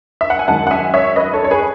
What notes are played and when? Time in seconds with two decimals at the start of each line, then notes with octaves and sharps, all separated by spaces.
0.21 E5
0.30 F#5
0.39 G#5
0.48 F#2 D#3 G#3 F#5 A5
0.67 F#5
0.71 E5 G#5
0.94 C#5 E5
1.16 B4 D#5
1.33 A4 C#5
1.44 C#5
1.51 G#4 B4